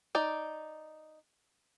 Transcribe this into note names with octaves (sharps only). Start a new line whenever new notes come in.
D#4 D5